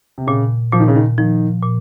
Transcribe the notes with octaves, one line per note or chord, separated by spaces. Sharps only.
C3
A#2 C#3
A#2 F3
D#3
C#3
D#3
D#3 F3
A#2